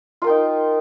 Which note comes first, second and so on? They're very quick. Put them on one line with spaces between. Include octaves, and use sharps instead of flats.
F4 A#4 G5 D#4